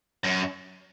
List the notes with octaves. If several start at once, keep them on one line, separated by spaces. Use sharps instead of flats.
F#2